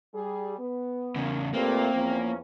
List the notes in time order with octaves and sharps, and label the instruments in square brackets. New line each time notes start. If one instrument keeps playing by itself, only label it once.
[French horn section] G3 G#4
B3
[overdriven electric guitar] E2 C#3 [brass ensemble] A#3
[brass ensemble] A#2 A3 [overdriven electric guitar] A#3 [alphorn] C4 [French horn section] F4 G4 B4
[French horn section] E2 [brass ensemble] F3 C#4